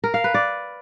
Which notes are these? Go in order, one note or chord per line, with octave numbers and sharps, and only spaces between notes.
A#4
F5
B4
D5